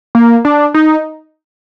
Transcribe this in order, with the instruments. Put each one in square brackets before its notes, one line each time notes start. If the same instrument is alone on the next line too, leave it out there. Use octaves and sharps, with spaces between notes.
[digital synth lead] A#3
D4
D#4